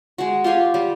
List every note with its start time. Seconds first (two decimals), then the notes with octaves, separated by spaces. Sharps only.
0.18 G#3 F#4
0.44 F4 G4 F5 G#5
0.74 G3